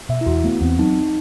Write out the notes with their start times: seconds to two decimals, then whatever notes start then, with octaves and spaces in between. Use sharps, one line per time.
0.09 B2 E5
0.21 E4
0.26 E2 F#4
0.44 A3 B3
0.61 E2 C4
0.79 F#3 D#4